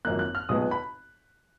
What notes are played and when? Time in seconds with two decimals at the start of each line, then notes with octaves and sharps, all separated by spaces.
0.05 G#1 F#2 F3 A#3 F#6
0.19 F#6
0.35 F6
0.49 B1 A#2 G#3 B3 D#6
0.71 B5